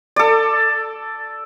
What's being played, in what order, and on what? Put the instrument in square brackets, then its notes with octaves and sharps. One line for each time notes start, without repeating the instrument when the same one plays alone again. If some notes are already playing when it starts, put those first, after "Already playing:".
[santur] A4 D5